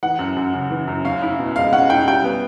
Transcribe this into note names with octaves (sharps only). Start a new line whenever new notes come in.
E3 F#5
F#2
F#2
C#3
E3
F#2
C#4 F5
E4
B2
G#3 F5
C#4 F#5
E4 G5
G3 G5
B3